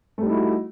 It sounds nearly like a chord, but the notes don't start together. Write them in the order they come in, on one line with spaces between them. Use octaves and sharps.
A3 G3 D#4 E4 F#4